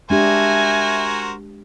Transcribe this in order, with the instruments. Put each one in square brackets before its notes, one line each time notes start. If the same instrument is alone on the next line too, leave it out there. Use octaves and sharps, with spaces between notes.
[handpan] G#3 D4 G4 [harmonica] F#4 A#4 C5 [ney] E5 [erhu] G#5